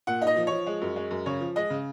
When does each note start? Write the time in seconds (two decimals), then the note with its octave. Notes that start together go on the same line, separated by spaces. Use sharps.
0.07 A#2 F#5
0.22 D#4
0.27 D#5
0.36 F3
0.47 F3 C#5
0.67 G#3
0.81 F#2
0.96 G#3
1.11 F#2
1.26 C#3 C#5
1.41 F3
1.56 G#3 D#5
1.70 C#3